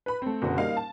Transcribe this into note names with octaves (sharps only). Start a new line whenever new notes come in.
B4 B5
A3 C4
F#1 B2 D3 F#4
G3 A#3 D#4 F5
A5